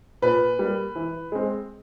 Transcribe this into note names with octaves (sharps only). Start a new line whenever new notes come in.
A#2 B4
G3 A#3
E3
G#3 C4